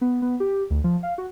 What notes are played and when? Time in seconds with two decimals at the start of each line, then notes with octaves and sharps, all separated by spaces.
0.01 B3
0.22 B3
0.40 G4
0.70 D2
0.84 F3
1.03 F5
1.18 F#4